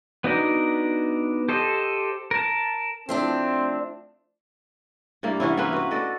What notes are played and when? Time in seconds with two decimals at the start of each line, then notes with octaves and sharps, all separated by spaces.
0.24 B3 D4 D#4 F#4 A#4
1.49 G4 A4 C5 D#5
2.31 A#4 A5
3.09 F3 A3 C4 D4
5.23 G2 G3 A#3 E4
5.40 E3 B3 C#4 E4
5.57 A#3 C4 C#4 B4
5.73 F#4 B4
5.91 F#4 A4 D5 D#5